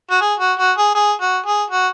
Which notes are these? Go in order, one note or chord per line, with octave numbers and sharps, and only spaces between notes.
F#4
G#4
F#4
F#4
G#4
G#4
F#4
G#4
F#4